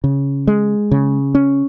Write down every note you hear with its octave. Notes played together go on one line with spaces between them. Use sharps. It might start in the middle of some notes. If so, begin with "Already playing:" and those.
C#3
G#3
C#3
C#4